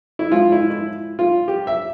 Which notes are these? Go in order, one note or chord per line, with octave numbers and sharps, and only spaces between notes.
E4
G#2 F3 G#3 F4
E4
E4
F4
G4
E5